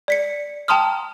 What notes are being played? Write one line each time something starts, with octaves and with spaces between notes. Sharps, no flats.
D5 B6 C#7
G5 A5 A#5 C6 D#6 F6